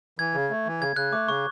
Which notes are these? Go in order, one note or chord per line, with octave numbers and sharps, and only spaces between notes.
E3 G#6
C#3
A3
E3
C#3 G#6
C#3 F#6
A3 D6
C#3 C#6